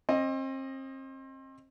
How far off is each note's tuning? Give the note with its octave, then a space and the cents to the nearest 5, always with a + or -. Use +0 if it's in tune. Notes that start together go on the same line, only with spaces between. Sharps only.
C4 +35 D#5 +0